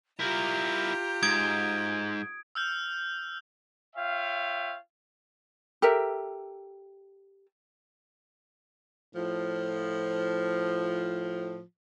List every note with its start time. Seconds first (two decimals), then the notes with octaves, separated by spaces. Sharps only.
0.19 E4 F4 G4 A#4 A#5 G6
1.23 G#2 D#6 G#6 D7
2.55 E6 F6 G6
3.96 F4 C#5 E5 F5 G5
5.82 G4 A4 A#4 E5
9.14 A2 F3